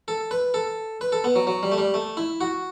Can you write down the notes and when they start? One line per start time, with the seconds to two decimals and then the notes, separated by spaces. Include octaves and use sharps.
0.08 A4
0.31 B4
0.54 A4
1.01 B4
1.12 A4
1.24 B3
1.36 F#3
1.47 F#3
1.63 G3
1.72 A3
1.78 G3
1.94 A3
2.17 E4
2.41 F#4